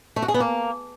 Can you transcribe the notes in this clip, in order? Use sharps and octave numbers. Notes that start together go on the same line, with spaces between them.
A3
F#4
G#4
B3
A#3